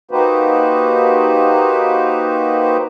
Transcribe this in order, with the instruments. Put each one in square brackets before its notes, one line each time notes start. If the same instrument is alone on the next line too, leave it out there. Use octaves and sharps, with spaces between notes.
[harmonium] A#3 D#4 F#4 G4 B4 C5